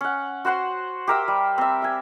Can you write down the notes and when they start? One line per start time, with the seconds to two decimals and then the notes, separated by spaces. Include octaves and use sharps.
0.01 C#4 F#5
0.45 F#4 C5 F#5 C6
1.07 G4 A#4 E5
1.28 G3
1.58 C4 E5
1.82 E5 G#5